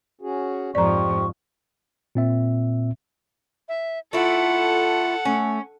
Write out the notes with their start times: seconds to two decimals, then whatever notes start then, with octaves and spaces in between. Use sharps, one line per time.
0.21 C#4 F#4 G#4
0.75 F2 G#2 F3 G4 C5 D5 A#5 C#6
2.15 A#2 C4 E5
3.69 E5
4.13 A3 E4 F4 A4 F#5
5.25 A3 C#4